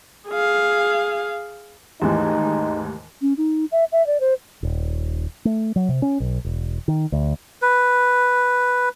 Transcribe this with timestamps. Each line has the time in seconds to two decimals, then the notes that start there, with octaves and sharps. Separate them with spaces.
0.29 G#4 F5
2.02 D#2 G#2 E3 A3 D#4 G4
3.22 C#4
3.38 D#4
3.72 E5
3.92 E5
4.07 D5
4.20 C5
4.63 D#1
5.45 A3
5.76 F#3
5.89 C3
6.02 C#4
6.20 B1
6.45 E1
6.88 D#3
7.12 D2
7.62 B4